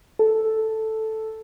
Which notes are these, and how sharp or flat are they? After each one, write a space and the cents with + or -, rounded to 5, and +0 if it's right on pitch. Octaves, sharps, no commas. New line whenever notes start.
A4 +0